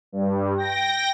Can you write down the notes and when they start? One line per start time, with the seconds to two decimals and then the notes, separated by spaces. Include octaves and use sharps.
0.12 G2
0.58 G5 A#6